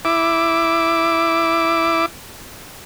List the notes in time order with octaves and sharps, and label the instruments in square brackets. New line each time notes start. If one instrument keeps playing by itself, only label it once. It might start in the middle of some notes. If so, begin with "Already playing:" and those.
[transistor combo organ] E4 D6